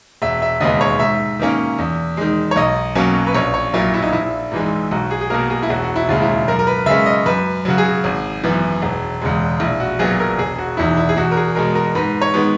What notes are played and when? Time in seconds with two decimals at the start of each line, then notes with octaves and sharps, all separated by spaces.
0.22 E1 E5
0.42 E5
0.61 D#2 C#3 G#3 B3 D#5
0.81 C#5
0.99 G#2 E5
1.39 D#3 A#3 C#4
1.78 E2
2.17 D#3 G#3
2.51 C#5
2.56 B1 D#5
2.95 B2 F#3 A#3 C#4
3.27 B4
3.34 A#1 C#5
3.54 C#5
3.74 A#2 F#3 A#3 E4
3.94 E4
4.02 D#4
4.12 A#1 E4
4.52 G#2 E3 G#3
4.91 B1 F#4
5.11 G#4
5.21 G#4
5.30 B2 A#3 A#4
5.50 G#4
5.63 E4
5.70 E1 F#4
5.84 F#4
5.96 E4
6.09 D#2 C#3 G#3
6.22 E4
6.48 F#2 A#4
6.59 A#4
6.67 B4
6.86 C#3 G#3 C#4 E5
7.06 D#5
7.26 F#2 B4
7.65 C#3 F#3 F#4
7.78 G#4
8.04 G#1
8.44 F#2 E3 B3
8.82 E1
9.22 E2 C#3 G#3
9.60 A#1 E4
9.80 F#4
9.99 A#2 F#3 B3 G#4
10.20 A#4
10.39 E1 G#4
10.58 F#4
10.77 E2 D#3 E4
10.97 E4
11.09 G#4
11.16 E2 F#4
11.31 A#4
11.37 G#4
11.55 B2 G#3 A#4
11.75 A#4
11.95 G#2 B4
12.21 C#5
12.34 D#3 G#3 B3